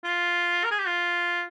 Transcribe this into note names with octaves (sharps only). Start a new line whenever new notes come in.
F4
A#4
G#4
G4
F4